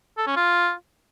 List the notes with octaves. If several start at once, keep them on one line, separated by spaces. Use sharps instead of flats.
A4
C#4
F4